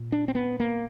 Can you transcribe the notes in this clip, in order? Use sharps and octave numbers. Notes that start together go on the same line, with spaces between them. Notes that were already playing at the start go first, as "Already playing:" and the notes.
Already playing: A#2
D4
C4
B3
A#3